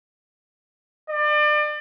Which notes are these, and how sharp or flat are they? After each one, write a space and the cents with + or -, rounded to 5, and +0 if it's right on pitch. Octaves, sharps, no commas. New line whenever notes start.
D5 +35